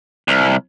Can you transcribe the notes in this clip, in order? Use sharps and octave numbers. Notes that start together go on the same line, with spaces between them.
C2